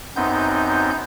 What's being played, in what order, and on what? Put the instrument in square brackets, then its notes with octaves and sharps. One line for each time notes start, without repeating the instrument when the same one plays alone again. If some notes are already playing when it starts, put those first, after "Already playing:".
[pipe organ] F#2 B3 C4 D#4 G6